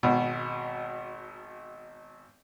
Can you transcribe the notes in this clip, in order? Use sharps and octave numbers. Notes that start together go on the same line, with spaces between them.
G#1 B2